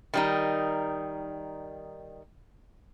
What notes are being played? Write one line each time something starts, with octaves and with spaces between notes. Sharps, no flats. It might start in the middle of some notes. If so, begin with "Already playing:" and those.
D#3 G3 D#4